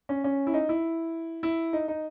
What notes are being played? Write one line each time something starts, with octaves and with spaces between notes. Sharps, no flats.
C#4
C#4
E4
D#4
E4
E4
D#4
D#4